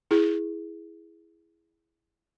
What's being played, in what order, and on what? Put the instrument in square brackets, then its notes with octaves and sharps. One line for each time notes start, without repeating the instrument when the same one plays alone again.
[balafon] E4 G#4